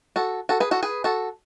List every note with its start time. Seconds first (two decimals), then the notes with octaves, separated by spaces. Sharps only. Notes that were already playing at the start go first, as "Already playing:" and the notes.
0.16 F#4 A4
0.49 F#4 A4
0.60 G#4 B4
0.71 F#4 A4
0.83 G#4 B4
1.04 F#4 A4